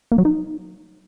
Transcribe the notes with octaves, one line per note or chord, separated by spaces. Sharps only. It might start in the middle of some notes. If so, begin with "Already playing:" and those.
A#3
F#3
D#4